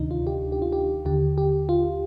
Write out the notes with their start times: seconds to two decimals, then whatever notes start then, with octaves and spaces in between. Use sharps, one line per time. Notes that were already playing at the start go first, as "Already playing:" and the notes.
Already playing: D2 C3 D#3 D4 D#4
0.11 F4
0.27 G4
0.52 G4
0.62 F4
0.73 G4
1.05 D#2 D3 G4
1.38 G4
1.69 F4